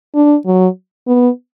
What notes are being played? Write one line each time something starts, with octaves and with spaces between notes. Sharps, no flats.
D4
F#3
B3